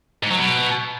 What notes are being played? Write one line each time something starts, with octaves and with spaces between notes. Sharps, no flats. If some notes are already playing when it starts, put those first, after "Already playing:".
G#2
F#3
B2